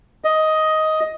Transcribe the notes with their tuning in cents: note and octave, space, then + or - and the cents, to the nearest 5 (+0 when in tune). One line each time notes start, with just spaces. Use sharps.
D#5 +10